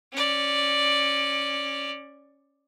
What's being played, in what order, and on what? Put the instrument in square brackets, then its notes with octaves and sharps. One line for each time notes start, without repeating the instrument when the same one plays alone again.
[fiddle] C#4 D5